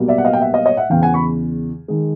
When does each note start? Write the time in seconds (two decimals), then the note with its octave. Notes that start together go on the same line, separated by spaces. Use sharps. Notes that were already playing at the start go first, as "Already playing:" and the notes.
Already playing: B1 B2 G3 A#3
0.08 D5 E5
0.18 F#5
0.25 D#5 F5
0.33 G5
0.41 E5 F#5
0.53 D#5 F5
0.65 C#5 D#5
0.77 E5 F#5
0.90 E2 C#3 E3 F5 G5
1.02 F#5 G#5
1.14 B5 C#6
1.88 D#3 G#3